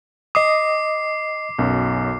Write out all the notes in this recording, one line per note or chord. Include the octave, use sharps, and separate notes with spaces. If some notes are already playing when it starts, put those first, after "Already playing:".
D#5 D6 D#6 C7
B1 F#2